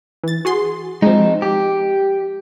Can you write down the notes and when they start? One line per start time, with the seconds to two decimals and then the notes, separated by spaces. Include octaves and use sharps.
0.24 E3 A6
0.45 F#4 G#4 C6
1.02 F3 G#3 C4 D#4
1.42 G4